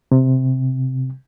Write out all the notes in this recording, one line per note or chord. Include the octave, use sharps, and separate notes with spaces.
C3